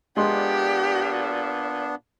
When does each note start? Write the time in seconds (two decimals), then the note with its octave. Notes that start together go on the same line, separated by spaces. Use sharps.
0.17 A#2 G#3 B3 D4 G4 C6